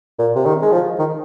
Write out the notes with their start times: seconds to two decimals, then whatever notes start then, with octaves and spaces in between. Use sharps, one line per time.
0.19 A#2
0.36 C3
0.46 D#3
0.62 G#3
0.72 F3
0.99 D#3